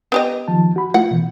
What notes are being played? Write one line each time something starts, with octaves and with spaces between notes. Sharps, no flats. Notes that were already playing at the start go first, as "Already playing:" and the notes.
B3 G4 D#5
D#3 F3 A5
F#4 B5
A3 E4 F4 F#5
B2 E3